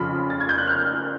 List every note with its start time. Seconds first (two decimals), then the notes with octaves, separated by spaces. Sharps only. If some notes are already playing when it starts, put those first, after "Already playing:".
Already playing: F2 C#3 F3 B5
0.30 A6
0.40 G#6
0.49 G6
0.58 F#6
0.67 F6